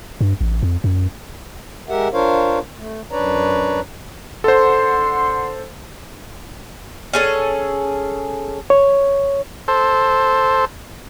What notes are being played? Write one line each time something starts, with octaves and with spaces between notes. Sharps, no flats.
G2
A1
F2
F#2
G#3 G4 A#4 E5 F#5
D4 F4 A#4 C5 C#5 F5
A3
F#2 D4 B4 C#5 D5 A#5
D3 A4 C5 F#5 C6
C#4 G#4 A4
C#5
A4 C5